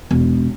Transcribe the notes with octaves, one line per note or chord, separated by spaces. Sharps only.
E1